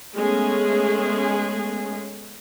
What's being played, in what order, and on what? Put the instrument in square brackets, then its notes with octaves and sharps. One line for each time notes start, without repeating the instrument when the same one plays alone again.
[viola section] G#3 A3 B3 C#4 G#4